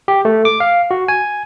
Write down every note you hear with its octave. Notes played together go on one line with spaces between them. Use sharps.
G4
A3
D6
F5
F#4
G#5